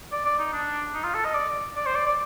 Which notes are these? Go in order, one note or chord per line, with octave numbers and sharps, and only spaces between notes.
D5
D5
D#4
D4
D#4
F4
A4
D#5
D5
D5
C5
D5
D5